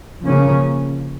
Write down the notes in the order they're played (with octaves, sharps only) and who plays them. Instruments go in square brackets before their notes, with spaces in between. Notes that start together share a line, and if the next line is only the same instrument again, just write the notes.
[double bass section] C#3 F3 A#3 C#4